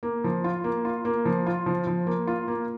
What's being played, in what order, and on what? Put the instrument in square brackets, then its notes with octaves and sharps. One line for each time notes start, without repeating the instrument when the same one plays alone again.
[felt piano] A#3
F3
F4
A#3
F4
A#3
F3
F4
F3
F3
A#3
F4
A#3